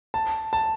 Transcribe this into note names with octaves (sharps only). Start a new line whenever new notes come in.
A5
A5